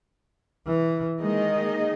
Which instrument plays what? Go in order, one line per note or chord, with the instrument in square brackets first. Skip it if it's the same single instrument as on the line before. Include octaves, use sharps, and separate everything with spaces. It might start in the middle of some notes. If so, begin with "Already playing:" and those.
[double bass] E3
[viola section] D#3 A#3 D#4 G#4 D#5 [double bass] G#3